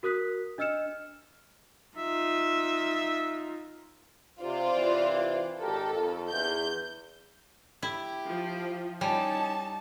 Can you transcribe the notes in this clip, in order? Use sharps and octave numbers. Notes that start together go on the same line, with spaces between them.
F#4 A#4 D#6 F#6 B6
D4 D#5 E6 F6 C#7 E7
D#4 F4 E5
C3 F4 C5 D5
C3 E3
G#1 G4 A4 A#4
F2
E2 G6
E4 G4
F3
G3 C#4 D#4 A5